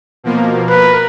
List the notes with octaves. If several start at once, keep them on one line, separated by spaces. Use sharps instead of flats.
B2 F3 A#3
A#4 B4